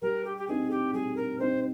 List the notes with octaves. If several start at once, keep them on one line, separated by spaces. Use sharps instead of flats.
G3 A#4
G4
G4
C4 D#4 G#4
G4
G3 G#4
A#4
C4 D#4 C5